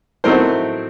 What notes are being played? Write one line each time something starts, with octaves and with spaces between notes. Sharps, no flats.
A2 F#3 A3 C4 D#4 A#4 C5